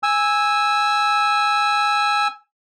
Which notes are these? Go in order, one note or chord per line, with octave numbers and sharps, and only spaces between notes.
G#5 E6